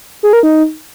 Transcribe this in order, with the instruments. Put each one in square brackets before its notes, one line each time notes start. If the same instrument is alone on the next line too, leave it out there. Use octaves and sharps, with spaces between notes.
[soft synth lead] G#4
A#4
D#4